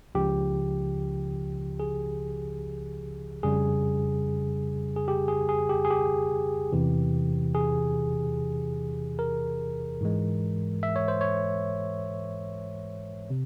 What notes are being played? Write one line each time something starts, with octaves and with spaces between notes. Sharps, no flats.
C#2 C#3 F3 G4
G#4
F2 C#3 G3 G#4
G#4
G4
G#4
G#4
G4
G#4
G4
E2 C3 E3
G#4
A#4
G#2 E3 G#3
E5
C#5
C5
C#5
C3